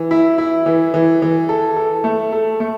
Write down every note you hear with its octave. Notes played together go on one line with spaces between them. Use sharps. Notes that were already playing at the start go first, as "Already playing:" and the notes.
Already playing: E3
E4
E4
E3
E3
E3
A4
A4
A3
A4
A3